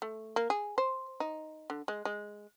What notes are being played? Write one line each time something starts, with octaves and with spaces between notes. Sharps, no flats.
A3
A#3
G#4
C5
D#4
D3
G#3
G#3